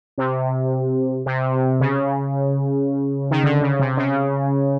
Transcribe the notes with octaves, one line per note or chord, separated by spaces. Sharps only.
C3
C3
C#3
D#3
D3
C#3
C3
C#3